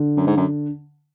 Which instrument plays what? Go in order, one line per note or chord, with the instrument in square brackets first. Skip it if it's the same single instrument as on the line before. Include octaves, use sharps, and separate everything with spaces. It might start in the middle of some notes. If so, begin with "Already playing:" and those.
Already playing: [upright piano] D3
[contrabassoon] F#2
G#2
F#2